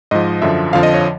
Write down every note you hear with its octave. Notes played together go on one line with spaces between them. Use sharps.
G#2 F3 D#5
F#2 D3 F3 E5
F2 D3 F3 F5
D#5
C#5